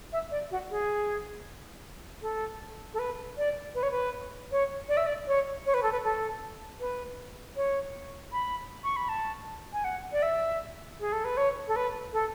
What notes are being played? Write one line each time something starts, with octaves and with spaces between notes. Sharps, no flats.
E5
D5
F#4
G#4
A4
A4
B4
D5
B4
C#5
B4
C#5
D5
E5
D5
C#5
C#5
B4
A4
B4
A4
B4
C#5
B5
C#6
B5
A5
G#5
F#5
D5
E5
G#4
A4
B4
C#5
A4
B4
A4